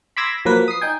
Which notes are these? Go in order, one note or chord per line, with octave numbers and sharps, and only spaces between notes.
B5 C6 D6 E6 G#6 A#6
F3 F#3 A#3 B4 B6
D#6 C7
D#4 G5 G#5